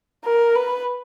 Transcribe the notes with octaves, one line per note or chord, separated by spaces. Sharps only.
A#4
B4